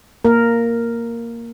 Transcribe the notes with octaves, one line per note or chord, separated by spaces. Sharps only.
A#3 A#4